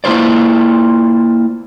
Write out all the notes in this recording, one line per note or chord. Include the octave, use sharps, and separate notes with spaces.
A#3 E4 F4 C5 D5